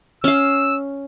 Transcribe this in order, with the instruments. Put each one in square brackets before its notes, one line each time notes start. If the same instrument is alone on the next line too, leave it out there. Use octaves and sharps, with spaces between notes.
[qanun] C#4 F5 [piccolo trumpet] E6